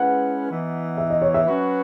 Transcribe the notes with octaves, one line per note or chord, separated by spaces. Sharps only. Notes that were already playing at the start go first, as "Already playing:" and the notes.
Already playing: G#3 C#4 E4 B4 F#5
E3 B3 D#4
E5
D#5
C#5
E5
F#3 C#4 F#4 B4